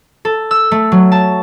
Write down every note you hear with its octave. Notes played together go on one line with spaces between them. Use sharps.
A4
E6
A3
F#3
A5